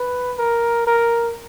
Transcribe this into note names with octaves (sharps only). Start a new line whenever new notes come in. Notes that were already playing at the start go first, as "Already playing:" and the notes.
Already playing: B4
A#4
A#4